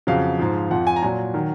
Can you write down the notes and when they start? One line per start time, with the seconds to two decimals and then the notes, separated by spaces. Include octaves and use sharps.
0.07 F2 C#3 F#3 F5
0.39 G#2 F3
0.71 F2 F3 F#5
0.87 G#5
0.96 A#5
1.02 A#2 F#3 G#5
1.34 D#3 F#3